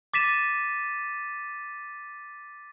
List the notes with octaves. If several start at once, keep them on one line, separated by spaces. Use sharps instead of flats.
D6 A6 B6 D#7 E7